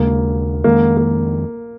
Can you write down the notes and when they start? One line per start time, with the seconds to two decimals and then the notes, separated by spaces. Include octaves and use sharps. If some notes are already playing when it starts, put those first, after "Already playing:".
Already playing: D#2 C#3 G#3 A#3
0.64 F2 D#3 G#3 A#3
0.97 A#3